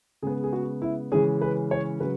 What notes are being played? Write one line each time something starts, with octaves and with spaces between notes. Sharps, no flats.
C#3 G#3 B3 G#4
G#4
F#4
E4
C#3 E3 G#3 C#4 G#4
B4
C#5
C#3 F#3 B4